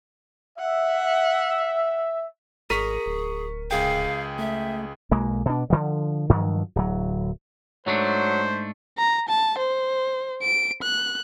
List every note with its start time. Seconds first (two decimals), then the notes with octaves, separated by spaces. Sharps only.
0.59 E5 F#5
2.70 G#1 G#4 A#4 C#6 B6 D#7
3.06 D1
3.71 C#2 G#4 F5 G5
4.39 A3 E5
5.11 B1 G#3 A#3
5.46 B2 D4
5.70 D3 D#3 F3
6.29 G2 D#3 F3 F#3
6.76 D1 F#3
7.86 G#2 F#3 A3 D4 C5
8.98 A#5
9.28 A5
9.58 C5
10.42 D7
10.82 F#6